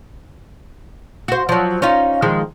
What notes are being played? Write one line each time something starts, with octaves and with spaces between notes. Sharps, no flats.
F#4 C5
F3 F#3
C#4 D#4 F4
D#3 F3 G#3